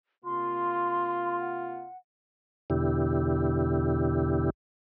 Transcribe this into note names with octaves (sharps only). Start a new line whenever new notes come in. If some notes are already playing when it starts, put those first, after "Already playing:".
C3 A#3 F4 C6
F#5
E2 B2 D3 E4 G4